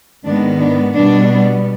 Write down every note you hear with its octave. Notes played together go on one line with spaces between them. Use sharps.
G#2 D#3 G#3 B3 D4
D4
B2 G3 B3 D4